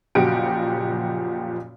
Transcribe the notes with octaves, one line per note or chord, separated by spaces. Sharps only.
F#1 A#2 F3 F#4 G4 D7